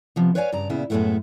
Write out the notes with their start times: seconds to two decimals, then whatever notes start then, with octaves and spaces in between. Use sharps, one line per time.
0.16 C3 F3 B3
0.35 B4 C#5 D5 F5 F#5 G#5
0.52 G2 C#3 D5 A#5
0.69 A#2 C#3 B3 E4
0.90 F#2 A2 G#3 A3 B3 E4